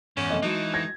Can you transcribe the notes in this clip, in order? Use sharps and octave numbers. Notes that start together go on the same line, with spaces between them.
E2 G#2 G#3 C#4
C3 A3 C4 D#5
E3 G#3 D#4 F#4 A5
G#6 A#6